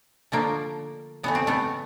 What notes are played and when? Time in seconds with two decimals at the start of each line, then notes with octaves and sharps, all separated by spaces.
0.32 D3 F3 A3 A#3
1.23 C#3 E3 A3 B3
1.35 C4
1.47 A3 B3